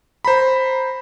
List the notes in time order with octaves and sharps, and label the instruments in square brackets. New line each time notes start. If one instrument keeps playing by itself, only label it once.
[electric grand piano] C5 A#5 B5